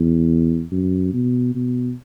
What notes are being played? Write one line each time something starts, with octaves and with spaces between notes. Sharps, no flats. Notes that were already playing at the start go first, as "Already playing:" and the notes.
Already playing: E2
F#2
B2
B2